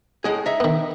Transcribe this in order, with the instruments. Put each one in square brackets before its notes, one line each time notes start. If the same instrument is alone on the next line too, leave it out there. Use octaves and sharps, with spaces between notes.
[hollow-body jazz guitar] A2 G#3 G#4
D#4 E5
[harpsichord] D#3 B3